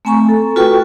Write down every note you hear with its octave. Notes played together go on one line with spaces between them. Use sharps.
A3 C4 G#5 A#5 C#6
A4
F4 F#4 A4 B4 G5 C#6